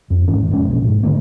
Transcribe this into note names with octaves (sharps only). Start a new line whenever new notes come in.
F2
G#1 G#2 E3 C#4
E1 F2 G#3 C#4
B1 A#2
G#2
D3 F#3 A3 A#3